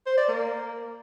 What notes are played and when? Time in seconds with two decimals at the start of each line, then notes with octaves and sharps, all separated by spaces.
0.06 C5
0.17 D5
0.28 A#3